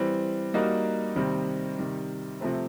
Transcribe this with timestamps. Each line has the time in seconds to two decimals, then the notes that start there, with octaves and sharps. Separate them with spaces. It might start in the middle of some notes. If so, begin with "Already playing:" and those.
Already playing: E3 G3 C4
0.54 G3 A#3 D#4 F#4 A#4
1.16 C3 D#3 G3 C4
1.79 C3 D#3 G3
2.41 C3 F3 A3 C4